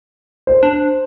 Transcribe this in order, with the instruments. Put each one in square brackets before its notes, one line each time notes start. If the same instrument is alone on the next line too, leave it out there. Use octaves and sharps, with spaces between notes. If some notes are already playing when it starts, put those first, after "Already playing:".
[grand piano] C5
[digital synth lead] D4